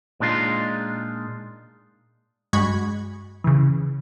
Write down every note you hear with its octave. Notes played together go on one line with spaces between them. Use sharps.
A#2 G#3 D4 D#4 F4
G2 G#3 F#4 B5 C#6 G#6
C#3 E3